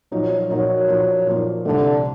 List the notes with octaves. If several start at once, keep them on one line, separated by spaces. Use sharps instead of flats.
A#2 F3 F#3 A#3 D#4
A#2 F3 F#3 A#3 D#4
A#2 F3 A#3 D#4
A#2 F3 A#3 D#4
C2 A#2 D3 F3 A3